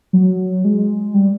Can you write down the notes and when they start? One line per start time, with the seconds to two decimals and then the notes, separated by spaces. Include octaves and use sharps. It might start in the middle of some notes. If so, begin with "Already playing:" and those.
0.13 F#3
0.65 G#3
1.14 G3